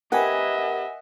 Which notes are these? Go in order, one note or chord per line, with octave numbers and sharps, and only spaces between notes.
C4 G4 A#4 B4 D#5 E5 F#5 G#5